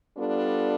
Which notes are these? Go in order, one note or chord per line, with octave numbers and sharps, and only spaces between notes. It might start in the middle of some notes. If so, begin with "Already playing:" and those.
G3 B3 D4 F4 A4